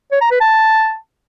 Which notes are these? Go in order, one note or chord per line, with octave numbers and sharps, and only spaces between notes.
C#5
A#5
B4
A5